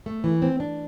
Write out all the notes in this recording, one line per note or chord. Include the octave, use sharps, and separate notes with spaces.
A3
E3
C4
D4